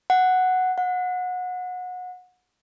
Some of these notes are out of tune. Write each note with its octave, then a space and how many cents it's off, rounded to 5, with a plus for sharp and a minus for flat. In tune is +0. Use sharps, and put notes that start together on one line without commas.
F#5 +0
F#5 -25